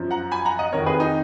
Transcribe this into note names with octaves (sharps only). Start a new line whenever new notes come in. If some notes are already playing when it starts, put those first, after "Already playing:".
Already playing: F#2 F3
F#5 A#5
G#5 B5
F#5 A#5
D#5 F#5
F2 D#3 A#4 C#5
G#4 B4
D#4